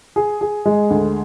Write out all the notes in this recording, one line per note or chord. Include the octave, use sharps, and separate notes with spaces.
G#4
G#4
G#3
D2